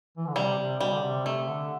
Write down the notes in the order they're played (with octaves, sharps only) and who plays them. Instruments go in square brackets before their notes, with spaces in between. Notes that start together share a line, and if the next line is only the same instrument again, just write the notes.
[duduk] E3
D3
[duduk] C3 [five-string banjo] G3
[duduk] C3
[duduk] B2 [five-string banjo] G3
[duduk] D3
C3
[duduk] C3 [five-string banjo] A3
[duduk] D3